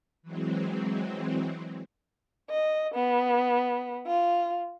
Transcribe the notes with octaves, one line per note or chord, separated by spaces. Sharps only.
E3 F#3 G#3 C4
D#5
B3
F4